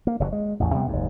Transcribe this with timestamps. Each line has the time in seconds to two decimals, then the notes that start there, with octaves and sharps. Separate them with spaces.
0.07 A#3
0.20 F#1 G2 F#3
0.32 G#3
0.60 A1 E2 A2
0.74 C3 G3 B3
0.89 F#1 D#2 G#2